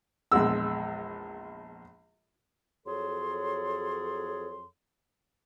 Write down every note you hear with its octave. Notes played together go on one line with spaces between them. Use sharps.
A#1 E2 G#3 E6
F2 F#3 G#4 A4 C#5 C6